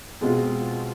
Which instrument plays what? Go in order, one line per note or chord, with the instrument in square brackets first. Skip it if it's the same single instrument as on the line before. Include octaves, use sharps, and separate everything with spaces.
[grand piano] B2 G#3 C4 F4 G#4